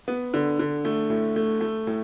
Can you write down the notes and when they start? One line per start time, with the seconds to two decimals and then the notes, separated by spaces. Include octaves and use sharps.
0.08 B3
0.34 D3
0.59 D3
0.85 A3
1.10 A2
1.36 A3
1.61 A3
1.87 A2